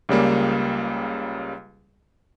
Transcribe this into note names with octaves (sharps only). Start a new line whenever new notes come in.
C#2 C#3 G3 A#3